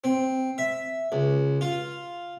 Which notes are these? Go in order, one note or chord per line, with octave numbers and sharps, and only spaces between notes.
C4
E5
C#2
F4